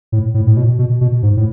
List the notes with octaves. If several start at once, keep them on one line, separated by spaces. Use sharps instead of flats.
A2
A2
A2
B2
B2
B2
G#2
A2